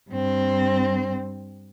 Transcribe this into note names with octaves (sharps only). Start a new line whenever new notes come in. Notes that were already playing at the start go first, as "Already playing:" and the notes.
G2 C4